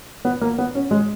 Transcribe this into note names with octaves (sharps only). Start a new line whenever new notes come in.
B3
A#3
B3
C#4
G#3